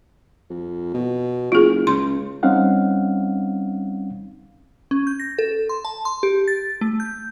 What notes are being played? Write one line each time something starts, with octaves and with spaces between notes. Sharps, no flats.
F2
B2
F#1 F4 G#4
C#2 C6
G3 C4 C#4 D#4 F5 F#5
C#4
G6
A#6
A4
C6
A5
C6
G4
A6
A3
G6